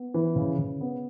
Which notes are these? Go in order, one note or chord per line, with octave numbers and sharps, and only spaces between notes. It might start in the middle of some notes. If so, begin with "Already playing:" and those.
Already playing: B3
E3
C#3
C#3
B3